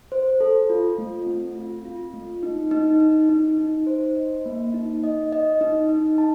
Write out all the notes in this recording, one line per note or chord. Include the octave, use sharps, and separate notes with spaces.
C5
A4
F4
A3
C4
F4
F4
A3
D#4
D#4
D#4
D#4
D#4
C5
D#5
A#3
D#4
D#5
D#5
D#4
D#4
A5